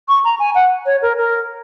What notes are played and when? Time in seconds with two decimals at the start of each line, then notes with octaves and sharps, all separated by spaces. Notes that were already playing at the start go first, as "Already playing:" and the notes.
0.09 C#6
0.25 A#5
0.39 G#5
0.55 F#5
0.86 C#5
1.02 A#4
1.17 A#4